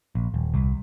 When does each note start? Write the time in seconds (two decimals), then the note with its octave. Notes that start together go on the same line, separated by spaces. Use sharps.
0.15 A#1
0.34 D#1
0.54 C2